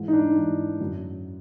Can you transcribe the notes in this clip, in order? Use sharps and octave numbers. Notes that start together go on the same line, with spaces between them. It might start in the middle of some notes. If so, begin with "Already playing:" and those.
Already playing: G#2 E3
D#4
D4
G#2 E3
F#2 D3